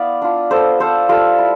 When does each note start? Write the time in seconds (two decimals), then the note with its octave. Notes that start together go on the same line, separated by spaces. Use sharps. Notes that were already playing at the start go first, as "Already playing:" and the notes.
Already playing: B3 E4 D5 F5
0.22 D4 F4
0.51 B3 A4 C5
0.80 D4 F4 A4 C5
1.09 G3 F4 A4
1.39 E4